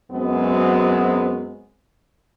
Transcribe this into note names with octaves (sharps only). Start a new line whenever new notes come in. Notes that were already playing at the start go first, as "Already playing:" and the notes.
F#2 F#3 G#3 B3 C4